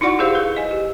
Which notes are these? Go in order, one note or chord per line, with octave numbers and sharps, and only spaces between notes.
D#4 E4 F#4 D5 F#5 C#6
E4 G4 G#4 C5 F5
B4
D#5 G#5
G4